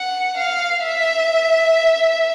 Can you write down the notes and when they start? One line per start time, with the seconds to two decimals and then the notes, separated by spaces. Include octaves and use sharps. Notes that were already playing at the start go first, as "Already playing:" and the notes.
Already playing: F#5
0.37 F5
0.84 E5